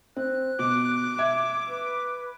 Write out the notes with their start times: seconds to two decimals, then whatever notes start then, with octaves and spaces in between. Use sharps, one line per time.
0.16 C4 F#6
0.59 B2 D6
1.18 E5 G#6
1.67 B4